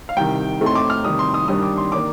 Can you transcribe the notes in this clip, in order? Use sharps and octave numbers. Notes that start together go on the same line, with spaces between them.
F5
C2 C3 D#3 G5
A2 A3 C4 D#4
C6
D6
F6
C3 D#3 G3 D#6
C6
D#6
G2 D#3 G3 D4 D#6
D6
C6
D#3 A#3 D4 D6